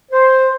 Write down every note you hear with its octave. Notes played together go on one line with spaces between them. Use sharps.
C5